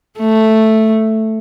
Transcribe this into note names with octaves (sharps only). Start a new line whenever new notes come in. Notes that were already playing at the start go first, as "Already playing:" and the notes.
A3